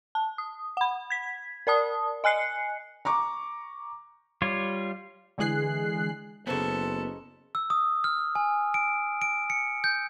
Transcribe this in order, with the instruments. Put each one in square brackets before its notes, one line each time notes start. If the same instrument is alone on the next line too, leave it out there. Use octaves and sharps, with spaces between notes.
[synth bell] A5
D#6
F#5 B5
G#6 B6
A#4 D5 A5 D#6
D#5 G#5 F#6 C7 C#7
[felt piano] A#5 C#6 D6
[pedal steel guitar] G3 F4 C#5
[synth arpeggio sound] D3 E3 G#3 G#4 F#6 C7
[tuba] F#1 [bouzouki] C#3 D#4 C5 [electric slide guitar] B3 [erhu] A4
[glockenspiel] E6
D#6
F6
G#5
D7
D7
C#7
G6